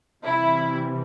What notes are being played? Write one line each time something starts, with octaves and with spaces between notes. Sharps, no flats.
C3 E3 G3 E4